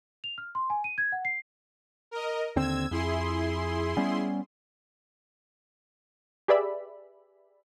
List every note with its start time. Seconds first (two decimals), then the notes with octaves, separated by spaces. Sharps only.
0.24 F7
0.38 F6
0.55 C6
0.70 G#5
0.84 D#7
0.98 G#6
1.12 F#5
1.25 C7
2.11 A#4 D#5
2.56 D#2 D3 C4 E6 G#6
2.91 F2 E4 G#4 C6
3.97 G3 B3 C#4
6.48 G4 G#4 B4 D5 E5 B5